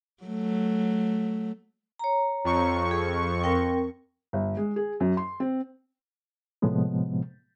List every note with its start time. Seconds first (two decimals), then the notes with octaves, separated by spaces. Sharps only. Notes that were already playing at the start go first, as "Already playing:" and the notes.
0.23 F#3 A3
1.99 C#5 A#5
2.44 F2 C#6
2.91 G#4
3.44 C4 A#4 G5
4.33 G1
4.57 G#3
4.76 G#4
5.00 F#2
5.17 C6
5.40 C4
6.62 A2 C3 F3 G#3 B3